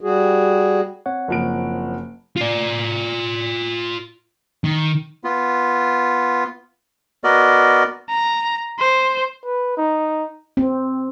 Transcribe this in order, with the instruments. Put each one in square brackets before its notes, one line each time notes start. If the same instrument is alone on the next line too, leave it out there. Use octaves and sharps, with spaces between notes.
[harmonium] G3 F#4 G#4
[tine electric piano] C4 C#5 F#5
[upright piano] F#1 F3 D7
[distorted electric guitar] F4 D5
D#3
[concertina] B3 F4
B3 F#4 A#4 D5 D#5
[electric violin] A#5
C5
[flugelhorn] B4
D#4
[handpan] C4